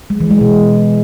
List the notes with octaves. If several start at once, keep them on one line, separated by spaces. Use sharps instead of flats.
G#3
E3
G#3
B2